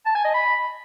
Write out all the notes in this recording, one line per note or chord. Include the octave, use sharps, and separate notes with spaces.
A5
G#5
D#5
B5